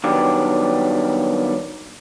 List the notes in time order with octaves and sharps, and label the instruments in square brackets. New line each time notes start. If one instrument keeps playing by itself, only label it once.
[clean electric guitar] D#3 F#3 G3 B3 D4 G4